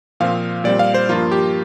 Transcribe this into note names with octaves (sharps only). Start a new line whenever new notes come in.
A#2 F3 C4 F5
A#2 G3 C4 D5
F5
C5
G2 F3 A#3 F4
G4